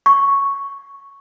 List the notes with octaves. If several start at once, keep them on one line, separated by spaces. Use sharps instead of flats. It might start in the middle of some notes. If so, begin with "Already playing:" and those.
C#6